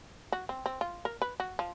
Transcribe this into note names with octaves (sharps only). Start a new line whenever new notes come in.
F#4
C4
C4
F4
A#4
B4
F#4
F3